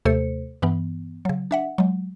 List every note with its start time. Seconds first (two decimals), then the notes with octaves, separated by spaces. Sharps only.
0.05 D#2 C3 A3 A4 C5 C#7
0.62 G2 E3 B3
1.25 C#3 F#3
1.51 D4 E5 F#5
1.78 F#3 G#3